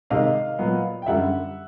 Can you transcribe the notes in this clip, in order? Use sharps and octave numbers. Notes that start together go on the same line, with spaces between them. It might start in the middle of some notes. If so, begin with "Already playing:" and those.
C3 D#3 G#3 D#5 F5
A#2 F#3 B3
G5
F#2 D3 G3 E5 F#5